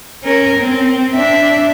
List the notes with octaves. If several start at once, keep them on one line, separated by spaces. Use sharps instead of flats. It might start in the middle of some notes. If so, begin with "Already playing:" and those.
C#4 A#4
C4
D4 E5